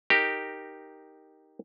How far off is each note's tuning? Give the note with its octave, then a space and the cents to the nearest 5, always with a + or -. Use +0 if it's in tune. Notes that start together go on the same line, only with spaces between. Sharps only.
D#4 +0 G4 +0 A#4 +0